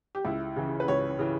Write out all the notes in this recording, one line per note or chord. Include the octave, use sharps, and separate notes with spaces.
G4
C#2 E4
C#3 E3
B4
C#2 C#5
C#3 E3